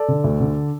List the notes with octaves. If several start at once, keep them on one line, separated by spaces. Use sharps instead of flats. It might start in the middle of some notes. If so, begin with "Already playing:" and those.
Already playing: A4 D5
D3
D2
D3